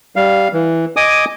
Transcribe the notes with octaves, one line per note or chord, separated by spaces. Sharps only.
G3 F5
E3
D#5 G#5 D6 D#6